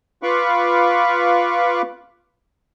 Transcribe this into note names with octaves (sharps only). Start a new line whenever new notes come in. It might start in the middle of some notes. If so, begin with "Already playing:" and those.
F4 B4 F5 B5 C#6 D6